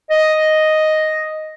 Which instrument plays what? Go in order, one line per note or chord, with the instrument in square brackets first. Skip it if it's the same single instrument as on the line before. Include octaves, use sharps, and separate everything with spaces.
[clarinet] D#5